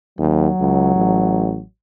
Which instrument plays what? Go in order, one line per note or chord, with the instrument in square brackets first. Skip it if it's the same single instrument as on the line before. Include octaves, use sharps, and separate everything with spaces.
[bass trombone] D#2 [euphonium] F#3
[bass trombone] C#2
A1